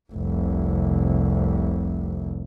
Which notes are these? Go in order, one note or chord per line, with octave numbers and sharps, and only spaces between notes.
F1 C2